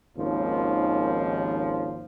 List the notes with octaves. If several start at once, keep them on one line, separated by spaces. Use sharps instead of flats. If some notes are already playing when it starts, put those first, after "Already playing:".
G#1 D#2 G#2 F3 C#4